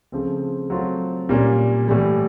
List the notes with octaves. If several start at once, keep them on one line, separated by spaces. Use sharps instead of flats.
C#3 F3 A3 C4
F#3 A3 C4 F4
A#2 G3 A#3 C#4
A2 E3 G3